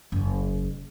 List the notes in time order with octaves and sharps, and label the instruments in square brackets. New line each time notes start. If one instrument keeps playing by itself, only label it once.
[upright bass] F#1 E2